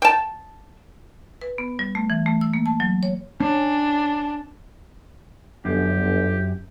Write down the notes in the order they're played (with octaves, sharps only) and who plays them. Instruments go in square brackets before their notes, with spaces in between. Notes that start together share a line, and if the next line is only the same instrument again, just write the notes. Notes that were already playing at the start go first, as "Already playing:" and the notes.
[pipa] G5 A5
[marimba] B4
B3
G3
A3
E3
A3
E6
A#3
A5
F#3
C#5
[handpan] C#4 [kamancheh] D4
[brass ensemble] G1 [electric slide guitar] F#2 [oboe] G4